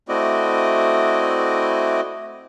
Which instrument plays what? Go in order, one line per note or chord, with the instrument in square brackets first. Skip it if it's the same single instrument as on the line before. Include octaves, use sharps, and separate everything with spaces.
[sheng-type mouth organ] A3 C4 E4 F#4 D5 D#5